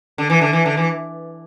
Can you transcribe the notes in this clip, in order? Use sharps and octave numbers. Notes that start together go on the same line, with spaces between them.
D3
E3
D3
E3
D3
E3